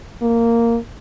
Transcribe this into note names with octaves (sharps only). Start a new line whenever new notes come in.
A#3